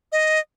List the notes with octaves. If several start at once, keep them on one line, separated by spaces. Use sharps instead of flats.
D#5